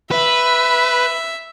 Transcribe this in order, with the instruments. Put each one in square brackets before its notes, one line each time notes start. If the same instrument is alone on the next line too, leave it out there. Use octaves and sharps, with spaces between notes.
[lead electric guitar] B4 [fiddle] E5